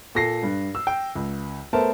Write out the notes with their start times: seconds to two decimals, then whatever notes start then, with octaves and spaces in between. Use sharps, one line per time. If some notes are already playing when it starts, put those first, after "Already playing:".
0.15 A#2 A4 A#6 C7
0.43 G2
0.75 E6
0.87 G5
1.15 C#2
1.73 A3 B3 A#4 C5 A5